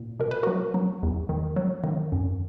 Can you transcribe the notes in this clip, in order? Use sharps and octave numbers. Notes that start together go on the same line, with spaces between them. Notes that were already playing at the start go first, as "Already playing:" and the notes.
Already playing: A#2
B2 A#4
B4
F#3 F#4 A#4
F#3
E2
D#3
F#3
D#3
F#2